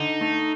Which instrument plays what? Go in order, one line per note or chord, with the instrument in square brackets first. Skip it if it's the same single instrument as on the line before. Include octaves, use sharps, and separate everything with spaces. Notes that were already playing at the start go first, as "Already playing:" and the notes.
Already playing: [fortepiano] D3 [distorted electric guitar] D#4
[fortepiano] A3